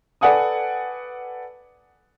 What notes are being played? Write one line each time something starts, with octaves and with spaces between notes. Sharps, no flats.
A4 B4 D5 F#5 G#5 D#6